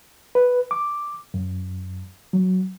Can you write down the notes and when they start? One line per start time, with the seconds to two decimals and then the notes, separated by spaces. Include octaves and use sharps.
0.35 B4
0.71 D6
1.34 F#2
2.33 F#3